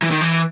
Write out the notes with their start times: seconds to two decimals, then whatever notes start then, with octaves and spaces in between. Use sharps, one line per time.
0.02 E3
0.11 D#3
0.21 E3